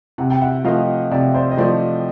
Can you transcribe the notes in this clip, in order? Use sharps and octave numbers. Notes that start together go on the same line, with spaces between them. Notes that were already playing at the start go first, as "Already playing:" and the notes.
C3 F#5
G5
E5 F#5
F3 A3 D#5 F5
C3 D5 E5
C5 D5
D#5
F3 A3 C5 D5